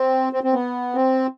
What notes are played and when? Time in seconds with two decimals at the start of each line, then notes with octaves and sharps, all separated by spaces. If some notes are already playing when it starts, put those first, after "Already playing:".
Already playing: C4
0.33 C4
0.44 C4
0.54 B3
0.95 C4